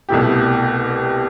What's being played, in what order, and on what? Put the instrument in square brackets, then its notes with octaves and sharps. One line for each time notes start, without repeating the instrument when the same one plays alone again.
[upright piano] C2 B2 A3 E4 G4